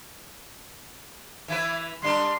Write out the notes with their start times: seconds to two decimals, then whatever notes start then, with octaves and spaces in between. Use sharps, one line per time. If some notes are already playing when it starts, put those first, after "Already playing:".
1.48 E3 E4 B4
2.02 G3 D4 A#4 C6